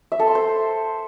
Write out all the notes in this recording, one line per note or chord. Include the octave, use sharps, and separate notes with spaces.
E5
A4
C6
C5